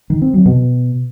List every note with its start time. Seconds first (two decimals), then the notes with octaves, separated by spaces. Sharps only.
0.10 D#3
0.22 C4
0.34 F#3
0.46 B2